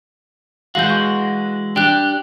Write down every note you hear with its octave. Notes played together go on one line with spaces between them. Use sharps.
E3 G#3 F#4 F5 G6
C#6
D4 G4 G5 F#6